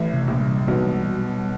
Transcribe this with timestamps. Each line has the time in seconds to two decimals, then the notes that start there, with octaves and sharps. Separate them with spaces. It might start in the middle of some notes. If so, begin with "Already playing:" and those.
Already playing: A1 A2 E3
0.13 C3
0.27 A#1 A#2
0.40 G3
0.67 B1 B2 E3
0.95 G3
1.23 B3